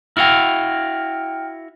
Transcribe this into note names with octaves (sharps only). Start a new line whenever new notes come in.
E4 F#4 F5 G5 F6